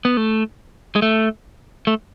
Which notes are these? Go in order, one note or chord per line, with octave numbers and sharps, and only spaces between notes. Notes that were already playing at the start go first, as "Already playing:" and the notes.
B3
A3
G#3
A3
A3